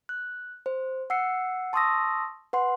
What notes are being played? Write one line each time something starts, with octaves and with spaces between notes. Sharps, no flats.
F#6
C5
F#5 E6 C7 C#7
A5 C6 C#6 D#6 E6 A#6
B4 F#5 C6